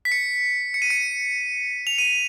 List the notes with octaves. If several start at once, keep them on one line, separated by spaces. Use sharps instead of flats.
B6
C#7
C#7
D#7
C#7
F7
D#7